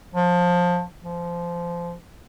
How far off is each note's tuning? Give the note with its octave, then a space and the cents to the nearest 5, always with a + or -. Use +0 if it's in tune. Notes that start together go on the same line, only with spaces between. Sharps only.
F3 +20
F3 -20